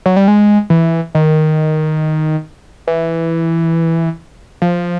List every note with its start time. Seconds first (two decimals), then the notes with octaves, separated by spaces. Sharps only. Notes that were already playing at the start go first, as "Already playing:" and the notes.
0.06 F#3
0.17 G3
0.28 G#3
0.70 E3
1.15 D#3
2.87 E3
4.62 F3